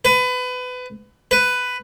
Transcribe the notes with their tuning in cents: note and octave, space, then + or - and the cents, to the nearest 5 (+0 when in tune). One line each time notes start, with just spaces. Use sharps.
B4 +25
B4 +10